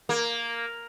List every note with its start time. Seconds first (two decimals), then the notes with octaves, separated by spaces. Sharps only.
0.09 A#3